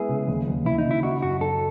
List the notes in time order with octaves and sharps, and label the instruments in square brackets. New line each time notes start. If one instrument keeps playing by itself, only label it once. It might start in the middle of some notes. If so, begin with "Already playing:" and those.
Already playing: [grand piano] G#3 B3 E4 [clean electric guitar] G#4
[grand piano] C#3
D#2
D#2
[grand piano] D#2 [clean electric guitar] E4
[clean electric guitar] D#4
[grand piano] C#3
[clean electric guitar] E4
[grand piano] D#4 [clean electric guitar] F#4
[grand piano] F#2 [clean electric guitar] F#4
[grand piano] D#4 [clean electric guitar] A4